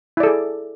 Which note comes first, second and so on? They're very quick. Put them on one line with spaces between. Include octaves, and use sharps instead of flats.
E4 D5 A4 G#4